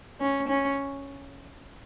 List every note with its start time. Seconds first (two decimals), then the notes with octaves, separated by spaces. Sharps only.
0.21 C#4
0.48 C#4